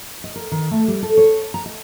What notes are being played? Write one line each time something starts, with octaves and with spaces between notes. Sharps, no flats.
D#5
A#4
D#3
A3
G3
A4
C#5
A#5
D#5